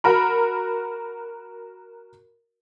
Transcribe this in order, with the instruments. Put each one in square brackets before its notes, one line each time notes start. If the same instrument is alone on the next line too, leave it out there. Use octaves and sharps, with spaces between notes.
[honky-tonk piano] F#4 A#4 B5